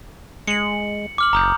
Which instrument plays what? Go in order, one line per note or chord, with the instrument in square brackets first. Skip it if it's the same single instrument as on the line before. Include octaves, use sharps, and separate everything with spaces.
[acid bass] G#3 [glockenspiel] C#7 F#7
[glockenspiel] D6 F6 F#7
[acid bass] F#1 [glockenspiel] A#5 D#6 G6